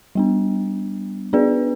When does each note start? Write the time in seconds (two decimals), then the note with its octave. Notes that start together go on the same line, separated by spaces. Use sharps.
0.15 G3 B3 D4
1.33 B3 D4 G#4 B4 D5